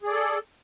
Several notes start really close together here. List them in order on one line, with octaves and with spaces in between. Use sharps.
G#4 D5 A4